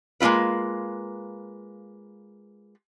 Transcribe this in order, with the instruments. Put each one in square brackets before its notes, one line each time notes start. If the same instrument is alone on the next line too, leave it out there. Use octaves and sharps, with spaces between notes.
[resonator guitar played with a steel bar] G#3 A#3 E4 F4 B4